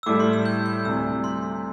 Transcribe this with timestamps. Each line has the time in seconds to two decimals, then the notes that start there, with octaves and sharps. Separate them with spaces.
0.03 E6
0.06 A2 G3 E4 A4 D6
0.20 C6
0.33 E6
0.46 G6
0.66 G6
0.85 D2 C3 G3 E6
1.24 C6